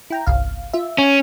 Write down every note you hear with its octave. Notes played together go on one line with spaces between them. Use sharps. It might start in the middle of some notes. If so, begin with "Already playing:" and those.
E4 G5 A#5
G1 C2 F5
F4 E5
C#4